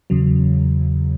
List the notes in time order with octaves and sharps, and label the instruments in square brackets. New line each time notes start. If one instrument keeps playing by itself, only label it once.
[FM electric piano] E2 C#3 F#3